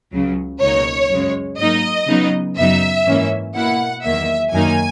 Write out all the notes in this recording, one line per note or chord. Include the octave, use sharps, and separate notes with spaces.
C#2 C#3 F#3
C#2 B2 A#3 D#4 C#5
F#2 C#3 G#3
G#2 F#3 A#3 D#4 D#5
C#3 F#3 B3 D#4
F#2 C#3 F#3 B3 D#4 E5
G#2 E3 A#3 C#4
B2 A#3 E4 F#5
E2 D#3 F#3 A#3 E5
F#2 D#3 A#3 D#4 G#5